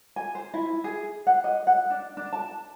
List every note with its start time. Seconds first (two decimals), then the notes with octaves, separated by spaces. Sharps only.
0.16 G#5
0.35 C5
0.54 E4
0.84 G#4
1.27 F#5
1.44 D#5
1.67 F#5
1.90 D4
2.17 D4
2.33 A5